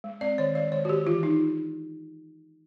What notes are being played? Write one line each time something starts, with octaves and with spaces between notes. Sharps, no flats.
G#3
C4 D5
D#3 C#5
G#3 D5
D#3 C#5
F#4
D#3 G4
E3 F4
D4 D#4